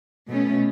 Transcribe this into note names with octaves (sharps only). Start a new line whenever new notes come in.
B2 A3 C#4